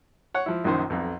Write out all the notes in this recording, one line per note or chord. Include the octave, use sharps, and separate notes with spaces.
C#5 F#5
F3 E4
A#1 F#2 D#3 C5
B1 F2